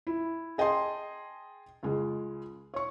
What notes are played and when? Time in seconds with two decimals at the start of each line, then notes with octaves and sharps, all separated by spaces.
0.07 E4
0.58 G#4 D#5 G5 A5 C6
1.83 C#2 G#3
2.74 C#5 C#6